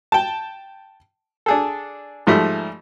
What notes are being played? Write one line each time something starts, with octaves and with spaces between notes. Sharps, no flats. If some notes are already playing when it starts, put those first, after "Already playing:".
G5 A5
D4 G#4 A4
G#2 F3 G3 A3